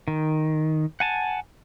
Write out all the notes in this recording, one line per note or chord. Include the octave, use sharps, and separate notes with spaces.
D#3
F#5 G#5 A5